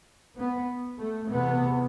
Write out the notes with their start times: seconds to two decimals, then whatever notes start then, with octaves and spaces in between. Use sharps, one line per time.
0.39 B3
0.99 A3
1.28 E2 C3 B3